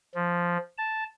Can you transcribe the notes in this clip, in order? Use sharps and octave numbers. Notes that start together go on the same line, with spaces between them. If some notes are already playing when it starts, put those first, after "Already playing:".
F3
A5